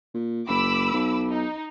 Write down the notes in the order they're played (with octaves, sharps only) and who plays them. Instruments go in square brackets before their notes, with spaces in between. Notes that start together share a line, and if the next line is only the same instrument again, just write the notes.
[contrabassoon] A#2
[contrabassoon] F#1 [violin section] B5 D6 E6
[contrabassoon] B1
[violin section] D#4